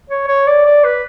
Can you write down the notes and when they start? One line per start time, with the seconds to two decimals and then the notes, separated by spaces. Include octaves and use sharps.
0.10 C#5
0.28 C#5
0.47 D5
0.66 D5
0.84 B4